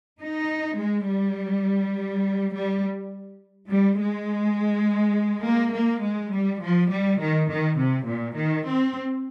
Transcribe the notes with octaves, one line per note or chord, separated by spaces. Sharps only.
D#4
G#3
G3
G3
G3
G#3
A#3
A#3
G#3
G3
F3
G3
D#3
D#3
C3
A#2
D#3
C4